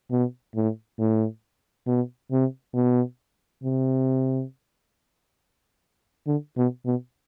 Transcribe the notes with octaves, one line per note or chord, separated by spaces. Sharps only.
B2
A2
A2
B2
C3
B2
C3
D3
B2
B2